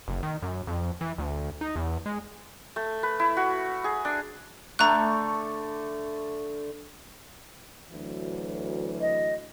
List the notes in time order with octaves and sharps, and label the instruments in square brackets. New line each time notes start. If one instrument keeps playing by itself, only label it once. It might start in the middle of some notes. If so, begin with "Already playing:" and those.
[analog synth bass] F#1
D#3
F#2
F2
E3
D2
D#4
E2
G#3
[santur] A3
B4
E4
F#4
G#4
D4
[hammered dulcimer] D3 A3 [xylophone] A#5 F#6
[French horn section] D2 E3 F#3
[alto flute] D#5